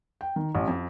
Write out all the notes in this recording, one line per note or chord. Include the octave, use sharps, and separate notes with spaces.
G5
D#3
A1
F2